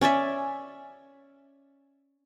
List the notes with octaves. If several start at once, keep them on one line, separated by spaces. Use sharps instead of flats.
C#4 C#5 D5 E5